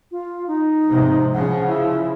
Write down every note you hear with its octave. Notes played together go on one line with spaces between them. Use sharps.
F4
D#4
G#2 C3 F3
C#3 F3 F#5
E4